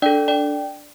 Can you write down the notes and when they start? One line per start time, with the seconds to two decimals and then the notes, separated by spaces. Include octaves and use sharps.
0.02 D4 A4 D5 G5
0.28 D5 G5